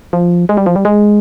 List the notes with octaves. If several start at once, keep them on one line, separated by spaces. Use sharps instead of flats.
F3
G#3
G3
F3
G3
G#3